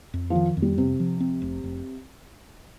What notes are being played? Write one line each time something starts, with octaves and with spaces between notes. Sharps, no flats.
F2
F3
D#3
F2
G3
C3 C4
F3
C4
F1
F1